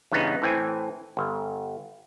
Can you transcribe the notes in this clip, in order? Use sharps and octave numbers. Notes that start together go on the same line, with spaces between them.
E2 G2 C#3 B3 D#4
A2 E3 C4 G#5
G1